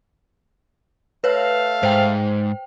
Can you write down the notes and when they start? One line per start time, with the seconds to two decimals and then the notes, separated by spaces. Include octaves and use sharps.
1.24 A3 B4 C#5 F5
1.83 G#2 C5 G5